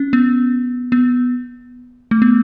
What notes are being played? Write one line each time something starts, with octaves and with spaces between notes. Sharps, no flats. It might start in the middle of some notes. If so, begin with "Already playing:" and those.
Already playing: C#4
B3
B3
A3
B3